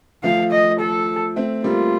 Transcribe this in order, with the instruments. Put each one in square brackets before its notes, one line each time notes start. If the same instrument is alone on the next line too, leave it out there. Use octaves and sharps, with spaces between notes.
[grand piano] F3 A3 [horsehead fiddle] F5
[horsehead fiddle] D#5
A4
[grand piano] A3 C4
[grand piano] G3 A#3 [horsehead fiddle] F4